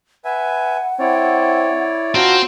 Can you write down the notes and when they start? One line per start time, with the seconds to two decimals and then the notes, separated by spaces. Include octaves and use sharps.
0.25 B4 E5 F#5 G#5
1.00 C4 E4 C#5 D5
2.15 C4 D4 F4 F#4 A#5